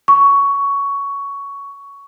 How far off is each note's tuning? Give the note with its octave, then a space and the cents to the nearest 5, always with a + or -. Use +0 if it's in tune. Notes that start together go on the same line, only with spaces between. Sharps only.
C#6 +10